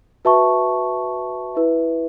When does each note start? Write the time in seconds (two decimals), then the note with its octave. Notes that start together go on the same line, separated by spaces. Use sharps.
0.25 F#4 B4 E5 A5 C#6
1.55 E4 B4 E5